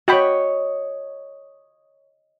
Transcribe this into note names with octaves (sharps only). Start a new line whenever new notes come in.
F#4 C#5 D#5 G5 B5